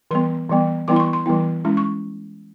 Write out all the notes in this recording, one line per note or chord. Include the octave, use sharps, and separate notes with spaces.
E3 G3 B3 C6
E3 G3 B3
E3 G3 B3 E4 D6
C6
C#6
C6
E3 G3 B3 E4
G#3 C#4 E4
C#6